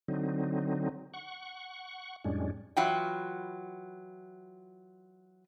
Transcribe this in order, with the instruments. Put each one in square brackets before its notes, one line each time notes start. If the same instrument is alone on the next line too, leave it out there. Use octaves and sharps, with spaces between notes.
[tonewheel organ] D3 F#3 C4 D#4
F#5 C#6
F2 A2 G3 G#3 C#4 D4
[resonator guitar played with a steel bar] E3 F#3 F4 F#5 G5